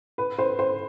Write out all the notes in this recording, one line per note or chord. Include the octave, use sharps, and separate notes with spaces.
B4
C5
C5